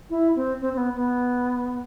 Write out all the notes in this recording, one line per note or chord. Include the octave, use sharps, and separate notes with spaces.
E4
C4
C4
C4
B3
B3